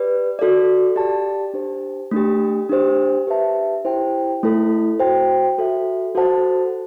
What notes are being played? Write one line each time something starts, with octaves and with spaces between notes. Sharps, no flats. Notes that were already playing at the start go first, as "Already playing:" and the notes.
Already playing: G4 B4 D5
F#4 A4 D5
G4 D5 A5
D4 G4 C5
A3 D4 G4
D4 G4 C5
G4 B4 E5 A5
E4 G4 C5 G5
A3 E4 A4
F#4 C5 G5
F#4 A4 E5
F#4 A4 C5 F#5 A5